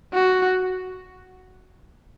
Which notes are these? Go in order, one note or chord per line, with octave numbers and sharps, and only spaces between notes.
F#4